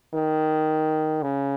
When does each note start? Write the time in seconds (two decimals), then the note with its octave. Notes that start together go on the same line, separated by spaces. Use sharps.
0.14 D#3
1.22 C#3